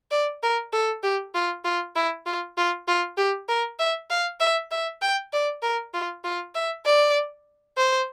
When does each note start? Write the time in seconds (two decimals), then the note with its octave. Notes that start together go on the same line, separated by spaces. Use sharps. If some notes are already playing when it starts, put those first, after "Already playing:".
0.11 D5
0.43 A#4
0.73 A4
1.03 G4
1.35 F4
1.65 F4
1.96 E4
2.26 F4
2.57 F4
2.88 F4
3.18 G4
3.49 A#4
3.79 E5
4.10 F5
4.40 E5
4.71 E5
5.02 G5
5.33 D5
5.63 A#4
5.94 F4
6.24 F4
6.55 E5
6.86 D5
7.77 C5